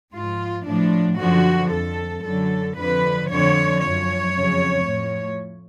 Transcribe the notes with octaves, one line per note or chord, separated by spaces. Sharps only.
G#2 F3 F4
A2 F3 D4
F#2 D3 F3 F#4
F2 F3 A4
F#2 D3 F#3 A4
F2 D3 F3 B4
F2 D3 F3 C#5
F#2 F3 C#5
F2 C#3 F#3
A2 F3